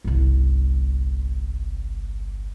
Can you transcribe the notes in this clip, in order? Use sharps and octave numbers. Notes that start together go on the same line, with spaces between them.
G1 C2